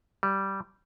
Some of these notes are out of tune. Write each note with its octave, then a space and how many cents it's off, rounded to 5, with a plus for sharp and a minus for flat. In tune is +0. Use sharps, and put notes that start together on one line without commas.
G3 -10